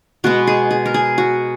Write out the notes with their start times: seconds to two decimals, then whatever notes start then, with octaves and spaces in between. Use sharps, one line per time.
0.24 B2 G#3 B3 F#4
0.47 G#4
0.71 G#4
0.86 A#4
0.94 G#4
1.18 F#4